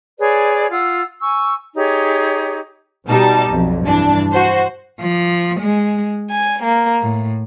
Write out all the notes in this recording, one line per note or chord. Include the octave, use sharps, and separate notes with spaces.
G#4 B4 C#5 D5
F4 F#5 E6
G#5 C#6 E6
D#4 G4 G#4 C#5
B2 G3 D#4 A5
B1 F2
G2 E3 D4
F#4 C5
F3
G#3
G#5
A#3
A2